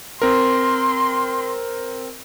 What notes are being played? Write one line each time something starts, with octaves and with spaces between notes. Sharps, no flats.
C4 A#4 C6